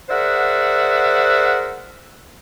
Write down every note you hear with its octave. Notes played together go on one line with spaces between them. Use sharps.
G#4 A#4 C5 D5 E5 F#5